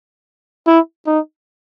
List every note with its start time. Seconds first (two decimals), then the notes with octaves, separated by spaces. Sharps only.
0.67 E4
1.07 D#4